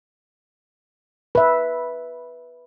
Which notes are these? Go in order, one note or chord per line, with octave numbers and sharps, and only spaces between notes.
B4 E5